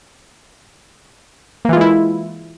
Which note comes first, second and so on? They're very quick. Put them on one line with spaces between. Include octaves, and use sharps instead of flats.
A#3 E3 F4 G#3 E4